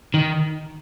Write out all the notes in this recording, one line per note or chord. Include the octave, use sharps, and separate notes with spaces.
D#3